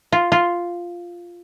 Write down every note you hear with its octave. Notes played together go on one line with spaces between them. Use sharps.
F4
F4